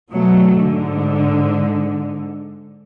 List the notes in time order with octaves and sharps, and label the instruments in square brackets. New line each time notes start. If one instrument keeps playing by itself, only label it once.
[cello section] B2 F#3 A3
G#2 D3